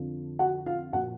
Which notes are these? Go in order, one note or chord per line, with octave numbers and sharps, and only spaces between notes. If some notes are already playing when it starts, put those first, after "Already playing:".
Already playing: F2 D3 F3
F#4 F#5
F4 F5
A#2 F3 F#4 F#5